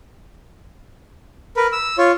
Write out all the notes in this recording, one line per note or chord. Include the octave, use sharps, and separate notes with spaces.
A#4 B4
E6
F4 C#5